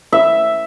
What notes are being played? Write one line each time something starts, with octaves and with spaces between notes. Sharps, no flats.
E5